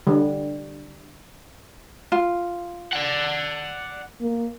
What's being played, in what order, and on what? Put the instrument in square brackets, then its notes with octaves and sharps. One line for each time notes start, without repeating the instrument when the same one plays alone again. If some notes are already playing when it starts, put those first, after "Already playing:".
[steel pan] D3 G3
[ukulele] F4
[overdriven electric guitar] D5 F#5
[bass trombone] A#3